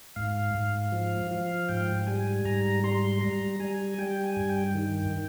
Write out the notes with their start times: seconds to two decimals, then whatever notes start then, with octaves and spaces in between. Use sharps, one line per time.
0.16 G#2 F5
0.54 G#2
0.92 F3
1.31 F3
1.69 G#2 G5
2.07 G3 G#5
2.45 G#2 A#5
2.84 G3 C6
3.21 G3 A#5
3.60 G3 G#5
3.98 G3 G5
4.24 G#5
4.37 G2
4.49 G5
4.75 D#3
5.13 D#3